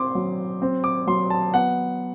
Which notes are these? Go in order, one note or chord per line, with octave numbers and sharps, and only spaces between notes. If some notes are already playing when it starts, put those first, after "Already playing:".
Already playing: C4 C6 D6
F#3
C4
D6
F#3 C6
A5
B3 F#5